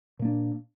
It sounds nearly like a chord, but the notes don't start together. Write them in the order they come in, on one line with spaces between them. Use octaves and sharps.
A#2 A#3 D4